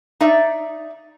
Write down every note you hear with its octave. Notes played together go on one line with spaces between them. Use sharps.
D#4 D5 E5